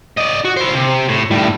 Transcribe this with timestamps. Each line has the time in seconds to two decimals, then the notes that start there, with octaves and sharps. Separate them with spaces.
0.18 D5 D#5
0.45 F#4
0.57 E4 C5
0.75 C3
1.09 A2
1.31 A2 G3